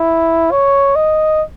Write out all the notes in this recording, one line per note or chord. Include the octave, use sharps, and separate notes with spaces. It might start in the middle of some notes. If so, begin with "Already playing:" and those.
Already playing: E4
C#5
D#5